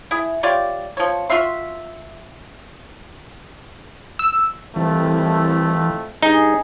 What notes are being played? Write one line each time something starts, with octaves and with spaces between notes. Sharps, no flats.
E4 G#4
F4 G4 C#5 D5
F3 C#5
F4 F#4 E5 C6
E6
C2 F2 E3 A3
G2 D#4 G#4